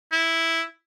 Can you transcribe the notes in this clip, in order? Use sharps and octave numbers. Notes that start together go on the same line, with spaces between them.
E4